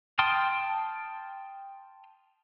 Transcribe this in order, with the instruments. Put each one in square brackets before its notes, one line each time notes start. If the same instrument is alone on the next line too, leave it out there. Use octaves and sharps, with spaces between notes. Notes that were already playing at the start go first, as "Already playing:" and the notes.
[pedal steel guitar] G5 A5 C6 D#6 F6